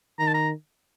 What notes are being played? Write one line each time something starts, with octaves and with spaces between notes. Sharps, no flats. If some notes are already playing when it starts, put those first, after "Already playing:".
D#3 A#5
A5
A#5